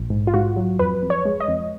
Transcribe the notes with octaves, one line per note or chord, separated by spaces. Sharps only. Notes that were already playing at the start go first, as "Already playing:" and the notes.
Already playing: A#1
G#2
F4
G#2 F#4
F#3
F2 B4
F2
C#5
G#3
D#5
F2